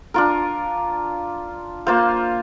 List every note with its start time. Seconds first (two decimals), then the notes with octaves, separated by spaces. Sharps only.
0.14 D4 F4 A#4
1.87 A#3 F4 C5 F5